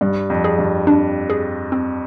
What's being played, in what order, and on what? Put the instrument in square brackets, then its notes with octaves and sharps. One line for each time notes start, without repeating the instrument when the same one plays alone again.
[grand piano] G2 [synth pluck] G3
[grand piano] F2
[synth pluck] G#4
[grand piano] G2
[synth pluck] D4
G#4
C4